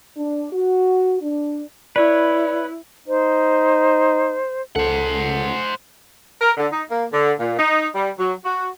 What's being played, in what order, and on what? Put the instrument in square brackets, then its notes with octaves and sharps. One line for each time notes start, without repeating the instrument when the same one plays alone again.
[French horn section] D4
F#4
D4
[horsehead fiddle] E4 [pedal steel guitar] B4 C#5 [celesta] D5
[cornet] D#4 [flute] C5
[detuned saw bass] C#2 [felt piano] A4 [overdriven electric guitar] C5 F#5
[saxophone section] A#4
D3
D#4
A#3
D3
A#2
D#4
G3
F#3
F#4